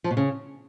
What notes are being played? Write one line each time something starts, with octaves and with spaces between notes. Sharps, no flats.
F3
B2
C#3